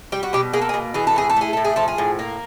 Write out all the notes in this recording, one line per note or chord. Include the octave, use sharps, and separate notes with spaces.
G3 G4
F#4
B2 G4
A#3 G#4
A4
G#4
B2
E3 G#4
A4
A2 G#4
A4
A3 G#4
A2 A4
G#4
F3 A4
G#4
A2
A#3